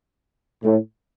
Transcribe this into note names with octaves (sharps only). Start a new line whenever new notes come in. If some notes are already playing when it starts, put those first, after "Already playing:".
A2